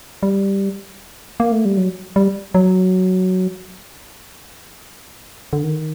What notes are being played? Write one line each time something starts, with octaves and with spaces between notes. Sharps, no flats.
G3
A#3
A3
G3
F#3
G3
F#3
D3
D#3